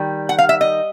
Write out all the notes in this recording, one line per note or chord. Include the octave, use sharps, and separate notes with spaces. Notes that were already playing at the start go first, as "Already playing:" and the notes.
Already playing: D#3 G3
F#5
F5
E5
D#5